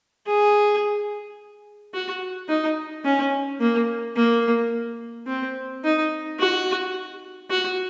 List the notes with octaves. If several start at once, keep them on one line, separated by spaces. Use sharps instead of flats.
G#4
F#4
D#4
C#4
A#3
A#3
C4
D#4
F#4
F#4